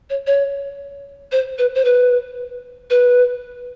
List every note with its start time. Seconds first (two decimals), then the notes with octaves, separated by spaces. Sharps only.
0.10 C#5
0.27 C#5
1.32 C5
1.58 B4
1.75 C5
1.85 B4
2.90 B4